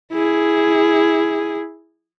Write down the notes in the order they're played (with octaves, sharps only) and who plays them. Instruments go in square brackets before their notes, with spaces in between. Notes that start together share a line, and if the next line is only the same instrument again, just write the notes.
[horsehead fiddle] E4 G#4